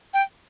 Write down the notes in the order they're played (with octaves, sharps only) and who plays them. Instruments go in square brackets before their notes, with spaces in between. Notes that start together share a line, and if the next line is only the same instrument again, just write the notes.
[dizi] G5